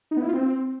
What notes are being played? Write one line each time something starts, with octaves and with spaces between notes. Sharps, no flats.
D#4
B3
E4
F4
C4